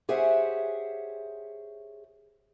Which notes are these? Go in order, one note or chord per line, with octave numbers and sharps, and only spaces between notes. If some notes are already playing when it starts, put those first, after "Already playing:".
G4 G#4 C5 C#5 E5 F#5